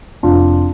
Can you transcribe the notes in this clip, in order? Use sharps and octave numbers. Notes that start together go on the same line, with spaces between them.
F1 D4 F4